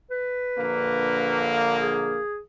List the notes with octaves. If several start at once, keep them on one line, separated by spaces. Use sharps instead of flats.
B4
A#1 D3 A#3
G#4